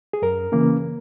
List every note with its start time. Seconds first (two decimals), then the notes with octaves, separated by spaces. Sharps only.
0.13 G#4
0.22 F#2 A#4
0.52 C#3 E3 A#3 C#4